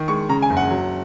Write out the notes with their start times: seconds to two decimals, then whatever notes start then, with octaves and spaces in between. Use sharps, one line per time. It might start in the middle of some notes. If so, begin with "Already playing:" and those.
Already playing: D#3
0.08 G#3 C#6
0.29 C#3 A#5
0.42 G#5
0.50 F#1
0.57 F#5
0.71 F#3